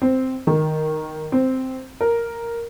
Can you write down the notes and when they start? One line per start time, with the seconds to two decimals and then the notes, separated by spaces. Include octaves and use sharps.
0.02 C4
0.47 D#3
1.32 C4
2.01 A#4